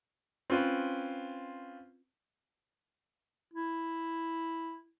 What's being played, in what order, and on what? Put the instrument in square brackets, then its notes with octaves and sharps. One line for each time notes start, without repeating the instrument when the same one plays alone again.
[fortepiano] C4 C#4 F4 B4
[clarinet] E4